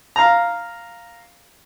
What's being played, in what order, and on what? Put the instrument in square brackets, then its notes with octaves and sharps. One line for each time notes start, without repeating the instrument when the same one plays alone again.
[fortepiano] F5 A#5